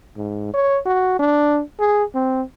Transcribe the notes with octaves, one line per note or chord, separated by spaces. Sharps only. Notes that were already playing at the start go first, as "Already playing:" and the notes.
G#2
C#5
F#4
D4
G#4
C4